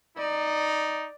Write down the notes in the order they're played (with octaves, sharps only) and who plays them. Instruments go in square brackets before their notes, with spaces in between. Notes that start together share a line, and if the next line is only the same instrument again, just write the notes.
[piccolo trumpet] D#4 [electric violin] D5